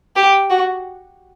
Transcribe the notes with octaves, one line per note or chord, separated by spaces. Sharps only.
G4
F#4